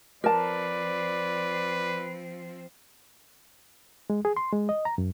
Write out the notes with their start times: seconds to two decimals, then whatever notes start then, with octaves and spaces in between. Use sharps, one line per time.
0.24 F3 C4 A#4 B4 D5 A5
4.10 G#3
4.25 G#4
4.37 C6
4.53 G#3
4.69 D#5
4.85 A#5
4.98 F#2